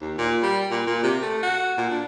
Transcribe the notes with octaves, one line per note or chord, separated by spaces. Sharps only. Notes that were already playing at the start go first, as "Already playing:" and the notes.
D#2
A#2
G3
A#2
A#2
C3
A3
F#4
A#2
D4